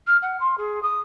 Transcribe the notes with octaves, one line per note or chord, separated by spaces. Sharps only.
F6
F#5
C6
G#4
D#6